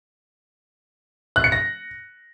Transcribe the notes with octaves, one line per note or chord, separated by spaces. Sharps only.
F#6
C#7
A#6